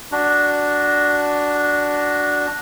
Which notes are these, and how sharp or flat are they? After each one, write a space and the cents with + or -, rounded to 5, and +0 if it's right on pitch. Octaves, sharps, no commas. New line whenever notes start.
D4 +0 F#4 +10